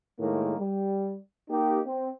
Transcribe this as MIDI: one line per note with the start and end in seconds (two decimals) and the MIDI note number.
0.19 0.54 45
0.19 0.54 51
0.19 0.54 56
0.19 0.54 58
0.59 1.17 55
1.50 1.80 58
1.50 1.80 63
1.50 1.80 67
1.85 2.09 60